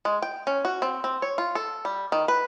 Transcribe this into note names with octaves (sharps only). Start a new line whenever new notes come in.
G#3
G5
C#4
F#4
C4
C4
C#5
F4
A4
G3
D#3
B4